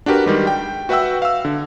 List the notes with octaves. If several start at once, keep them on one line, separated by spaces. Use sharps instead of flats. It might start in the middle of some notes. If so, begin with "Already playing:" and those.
D4 F#4 G4 A#4 B4
D#3 G3 G#3
G5
F#4 B4 E5 F#5 G5 E6
F5 E6
D3